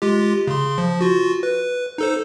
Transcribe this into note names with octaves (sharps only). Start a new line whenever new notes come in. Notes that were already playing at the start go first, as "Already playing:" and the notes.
G#3 F4 G4
C#3 C6
F3
F4 F#4
B4
D#4 A4 C5